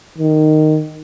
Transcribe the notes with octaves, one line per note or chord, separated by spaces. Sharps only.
D#3